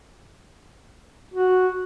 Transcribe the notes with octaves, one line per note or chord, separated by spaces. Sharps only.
F#4